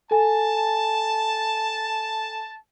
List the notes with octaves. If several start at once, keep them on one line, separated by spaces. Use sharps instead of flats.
A4 G#5 A5